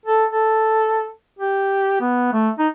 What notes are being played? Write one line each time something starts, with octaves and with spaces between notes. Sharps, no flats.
A4
A4
G4
B3
A3
D#4